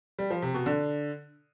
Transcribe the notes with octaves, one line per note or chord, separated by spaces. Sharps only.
G3
F3
C3
B2
D3